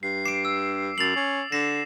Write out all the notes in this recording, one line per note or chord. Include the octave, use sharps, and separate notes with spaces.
G2 C7
D6 C7 D7
E6
F#2 A6 C7 F7 F#7
C#4
D3 A#6 C7 E7